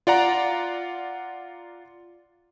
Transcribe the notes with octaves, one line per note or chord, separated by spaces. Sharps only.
F4 D5 F#5 A#5